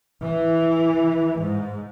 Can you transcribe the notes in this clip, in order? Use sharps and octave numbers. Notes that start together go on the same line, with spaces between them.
E3
G#2